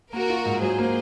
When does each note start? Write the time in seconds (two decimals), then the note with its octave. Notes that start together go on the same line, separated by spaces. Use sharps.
0.13 A#3 F#4 A#4
0.30 F4
0.46 G#2
0.62 F#3 G#4 C5
0.78 A#3